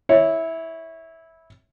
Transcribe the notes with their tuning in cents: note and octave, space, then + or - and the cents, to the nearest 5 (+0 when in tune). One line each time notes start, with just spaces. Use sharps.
E4 -15 C#5 +0